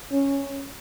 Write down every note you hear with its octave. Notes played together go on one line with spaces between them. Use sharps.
C#4